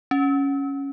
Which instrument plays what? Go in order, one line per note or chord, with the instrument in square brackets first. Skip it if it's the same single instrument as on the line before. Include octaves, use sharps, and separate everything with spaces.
[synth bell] C#4